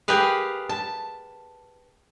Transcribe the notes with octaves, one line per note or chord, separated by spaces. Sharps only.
G4 G#4 A#4 B4 F5
A5